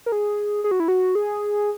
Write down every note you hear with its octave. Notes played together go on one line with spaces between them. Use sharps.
A#4
G#4
G#4
F#4
E4
F#4
G#4